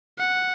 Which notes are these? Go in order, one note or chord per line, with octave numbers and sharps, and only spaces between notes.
F#5